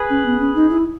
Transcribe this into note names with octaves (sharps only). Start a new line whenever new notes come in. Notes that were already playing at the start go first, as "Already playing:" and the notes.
Already playing: G#4 B4
C#4
B3
C#4
D#4
E4